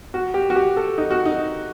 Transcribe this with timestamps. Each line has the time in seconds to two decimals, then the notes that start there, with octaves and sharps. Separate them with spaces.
0.14 F#4
0.34 G4
0.50 F#4
0.56 G4
0.77 A4
0.98 D#4
1.10 F#4
1.25 D#4